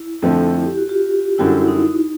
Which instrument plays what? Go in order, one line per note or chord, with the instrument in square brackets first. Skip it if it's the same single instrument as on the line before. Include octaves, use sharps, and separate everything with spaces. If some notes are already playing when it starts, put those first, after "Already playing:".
Already playing: [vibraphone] E4
[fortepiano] F2 D3 F3 A3
[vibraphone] E4
G4
F#4
F4 G4
[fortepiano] F#2 D3 G3 [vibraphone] E4 F#4
[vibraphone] E4
D#4
E4
D#4